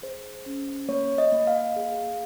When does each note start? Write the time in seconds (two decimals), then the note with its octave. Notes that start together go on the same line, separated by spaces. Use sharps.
0.02 G#4 C5
0.46 C#4
0.89 A#3 C#5
1.18 D#5
1.32 A#3
1.47 F5
1.76 G#4